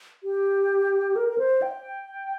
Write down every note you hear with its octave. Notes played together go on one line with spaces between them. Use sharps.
G4
A#4
A#4
C5
G5